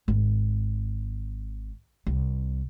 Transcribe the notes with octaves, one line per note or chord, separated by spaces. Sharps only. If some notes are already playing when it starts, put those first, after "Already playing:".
G#1
C2